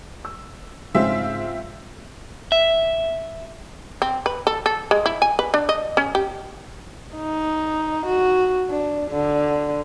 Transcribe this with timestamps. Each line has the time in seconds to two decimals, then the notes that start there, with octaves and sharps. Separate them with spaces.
0.25 E6
0.95 G#2 C#3 G#3 C4 F4 E5
2.52 E5
4.02 C4
4.26 B4
4.47 A4
4.66 A4
4.91 G#3
5.06 E4
5.22 G#5
5.39 B4
5.54 D4
5.69 D#5
5.97 C#4
6.15 G4
7.16 D#4
8.06 F#4
8.70 D4
9.11 D3